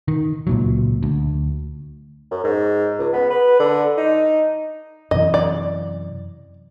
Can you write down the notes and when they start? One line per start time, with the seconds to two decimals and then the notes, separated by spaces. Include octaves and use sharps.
0.08 D#3
0.47 C#2 A#2 F#3
1.03 D2
2.31 F#2
2.44 G#2
2.99 C#2
3.13 B3
3.30 B4
3.59 D3
3.97 D#4
5.11 F#2 C3 E3 D#5
5.34 D5